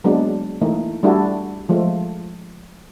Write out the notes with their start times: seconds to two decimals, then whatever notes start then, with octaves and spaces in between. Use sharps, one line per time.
0.04 F#3 G#3 A#3 B3 D4
0.61 E3 A3 A#3 D#4
1.03 G3 A3 D4 E4 F#4 A4
1.69 F3 G#3 A3